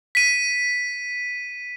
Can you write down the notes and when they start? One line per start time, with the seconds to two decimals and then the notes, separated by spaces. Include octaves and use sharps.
0.15 B6 D#7